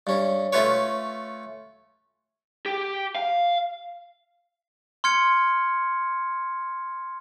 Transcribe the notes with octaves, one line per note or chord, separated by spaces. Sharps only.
G2 C#4
A3 C#4 F4 B4 C#5
G4
F5
C6 F6 G#6 C#7